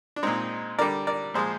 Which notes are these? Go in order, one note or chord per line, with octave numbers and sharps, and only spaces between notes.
D4
A#2 G#3 C4 D#4
D3 G3 A#4 D5
A#4 D5
A#2 F3 G#3 G#4 C5